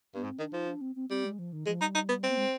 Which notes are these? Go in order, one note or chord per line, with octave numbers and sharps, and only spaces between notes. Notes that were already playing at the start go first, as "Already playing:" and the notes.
G2 B3
G#2 C4
D#3 D4
F3 D#4
D4
C4
C4
G3 C4
G#3
F3
D#3
F3 G#3
G3 D#4
D#4
B3
C4
B3
G#3